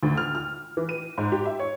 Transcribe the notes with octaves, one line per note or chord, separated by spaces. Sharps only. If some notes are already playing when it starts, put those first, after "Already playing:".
D2
F6
F6
E3
D#7
G#2
G4
E5
C#5